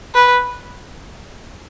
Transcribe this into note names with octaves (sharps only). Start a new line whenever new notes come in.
B4